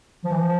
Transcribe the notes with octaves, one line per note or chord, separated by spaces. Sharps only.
F3
E3
F3